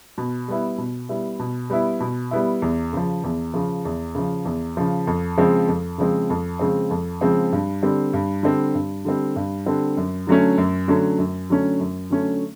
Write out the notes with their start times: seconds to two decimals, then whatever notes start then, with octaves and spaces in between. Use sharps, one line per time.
0.18 B2
0.48 G3 B3 E4
0.78 B2
1.09 G3 B3 E4
1.39 B2
1.70 G3 B3 E4
2.00 B2
2.31 G3 B3 E4
2.62 E2
2.93 C#3 F3
3.24 E2
3.54 C#3 F3
3.85 E2
4.15 C#3 F3
4.45 E2
4.77 C#3 F3
5.07 F2
5.37 C#3 F3 G#3 C4
5.68 F2
5.98 C#3 F3 G#3 C4
6.30 F2
6.59 C#3 F3 G#3 C4
6.90 F2
7.21 C#3 F3 G#3 C4
7.52 G2
7.83 D3 G3 C4
8.13 G2
8.43 D3 G3 C4
8.74 G2
9.05 D3 G3 C4
9.36 G2
9.66 D3 G3 C4
9.97 F#2
10.27 D3 F#3 A3 C#4
10.58 F#2
10.88 D3 F#3 A3 C#4
11.19 F#2
11.50 D3 F#3 A3 C#4
11.80 F#2
12.10 D3 F#3 A3 C#4